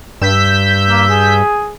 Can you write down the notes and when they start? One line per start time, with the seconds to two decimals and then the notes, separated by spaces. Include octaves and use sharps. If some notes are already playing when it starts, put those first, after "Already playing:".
0.21 G2 E6 G6 B6
0.90 A#3
1.10 G#4